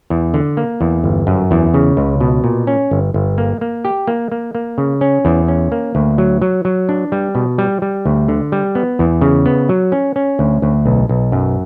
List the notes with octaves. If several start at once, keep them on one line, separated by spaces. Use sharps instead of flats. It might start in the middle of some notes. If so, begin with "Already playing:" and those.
E2
D3
A#3
E2
G1
F#2
E2
C#3
C#2
B2
A#2
C#4
G1
G1
A#3
A#3
G4
A#3
A#3
A#3
C#3
C#4
E2
C#4
A#3
D2
F#3
F#3
F#3
D4
G3
B2
G3
G3
D2
D3
G3
B3
E2
C#3
B3
F#3
C#4
C#4
D2
D2
B1
B1
F#2